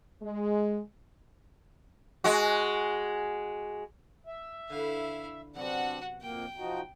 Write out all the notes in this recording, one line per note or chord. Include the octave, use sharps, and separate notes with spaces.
G#3
G#3 F#4
E5
D3 E4 B4 F5 F#5
C3 F#3 B3 C4 D4 F#4 F#5
F2 A#3 G5
F3 D#4 F#4